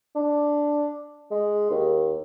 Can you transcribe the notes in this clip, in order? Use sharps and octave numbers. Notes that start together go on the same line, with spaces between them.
D4
G#3
D#2